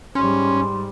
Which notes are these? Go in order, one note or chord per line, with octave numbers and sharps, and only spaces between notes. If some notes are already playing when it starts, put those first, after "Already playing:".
G#2 G3 C#4 C6